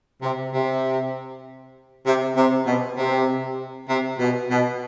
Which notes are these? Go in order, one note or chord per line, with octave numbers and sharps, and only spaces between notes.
C3
C3
C3
C3
B2
C3
C3
B2
B2